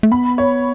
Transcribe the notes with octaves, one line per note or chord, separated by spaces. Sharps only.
A3
B3 B5
C#5